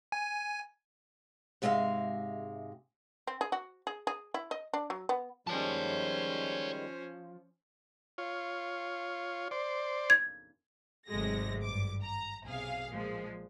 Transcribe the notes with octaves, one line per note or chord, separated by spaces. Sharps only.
G#5
G#2 C3 G#3 F4 E5 F5
C4
G#4
F#4
G#4
G#4
E4
D#5
D4
F#3
B3
D#3 F3 G3 G#3 C#4 C5 C#5 A5
F4 C#5
C5 D5
G#6
G#1 C3 F#3 G#3 A3 A#6
G2 D6
A#5
B1 C3 G#4 F5
A#2 F3 G#3